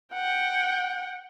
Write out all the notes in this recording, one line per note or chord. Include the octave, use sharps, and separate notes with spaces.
F#5 G5